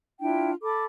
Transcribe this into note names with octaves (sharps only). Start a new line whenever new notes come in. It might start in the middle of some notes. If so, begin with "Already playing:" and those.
D4 E4 F4 G5
A4 B5 D6